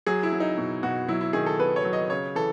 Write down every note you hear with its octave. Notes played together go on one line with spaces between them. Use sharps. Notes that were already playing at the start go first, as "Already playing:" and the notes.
F#3 G#4
E4
F#3
D#4
B2
B2 F#4
F#3 E4
E4
D#3 G#4
A4
B3 B4
C#5
F#3
D#5
C#3 C#5
E3 A4